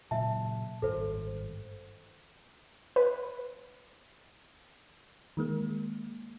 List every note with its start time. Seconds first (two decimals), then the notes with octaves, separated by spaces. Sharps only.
0.11 A#2 C#3 F#3 E5 A5
0.82 G#1 G2 A4 C5
2.96 B4
5.37 D#3 G#3 A#3